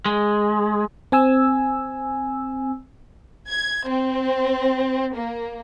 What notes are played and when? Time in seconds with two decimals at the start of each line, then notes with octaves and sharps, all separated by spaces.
0.06 G#3
1.12 C4 G#5 E6
3.47 G#6
3.86 C4
5.14 A#3